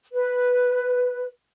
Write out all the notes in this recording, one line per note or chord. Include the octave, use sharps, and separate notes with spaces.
B4